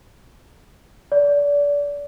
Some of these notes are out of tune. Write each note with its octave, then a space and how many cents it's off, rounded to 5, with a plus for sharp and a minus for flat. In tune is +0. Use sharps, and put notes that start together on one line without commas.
D5 -30